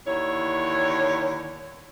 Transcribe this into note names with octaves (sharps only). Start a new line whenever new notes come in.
D#2 D3 E4 C#5